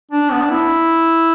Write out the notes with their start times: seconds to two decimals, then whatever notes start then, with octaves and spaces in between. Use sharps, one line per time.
0.11 D4
0.32 B3
0.42 D4
0.51 E4